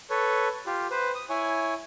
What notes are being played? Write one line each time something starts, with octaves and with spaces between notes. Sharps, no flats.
A4 B4 C#5
F4 G4
B4 C5
D#6
E4 C#5 G#5